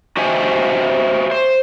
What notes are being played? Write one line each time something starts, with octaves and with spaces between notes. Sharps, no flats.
F#4 G4 C5 D#5 E5 G#5
C5